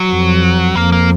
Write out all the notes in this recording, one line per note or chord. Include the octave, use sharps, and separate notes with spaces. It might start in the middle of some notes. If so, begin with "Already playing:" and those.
Already playing: F#3
F2
F2 A#3
A#3